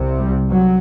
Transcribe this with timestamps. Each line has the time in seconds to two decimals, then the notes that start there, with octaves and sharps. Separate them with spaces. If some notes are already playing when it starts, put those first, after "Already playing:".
Already playing: C2 C3
0.19 G3
0.49 F#3